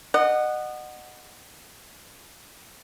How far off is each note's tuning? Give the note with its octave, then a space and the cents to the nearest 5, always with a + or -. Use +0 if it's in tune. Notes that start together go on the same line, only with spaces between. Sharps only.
D#5 -30 F#5 +0